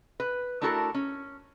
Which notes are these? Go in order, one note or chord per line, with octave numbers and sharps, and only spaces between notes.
B4
A3 D4 E4 F#4 A4 A#4
C#4